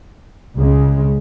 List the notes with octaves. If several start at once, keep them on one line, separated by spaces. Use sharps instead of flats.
C#2 C#3 G#3